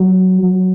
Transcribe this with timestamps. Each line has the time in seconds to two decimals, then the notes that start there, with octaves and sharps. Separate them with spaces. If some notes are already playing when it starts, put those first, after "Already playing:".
Already playing: F#3
0.42 F#3